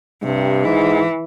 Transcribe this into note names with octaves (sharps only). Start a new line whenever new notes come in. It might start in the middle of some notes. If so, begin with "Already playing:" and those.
G2 C3
G#2 E3